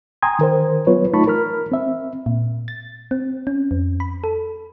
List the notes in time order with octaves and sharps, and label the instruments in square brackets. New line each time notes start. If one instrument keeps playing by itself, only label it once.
[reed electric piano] G5 G#5 A#5 C6 D#6 G#6
D#3 A#4 C5
F#3 B3 F4 B4 C#5
A3 D#4 F4 A5 B5 C#6
A#4 B5 F6
C4 E5
[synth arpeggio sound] A#2
A6
C4
C#4
F2
B5
A4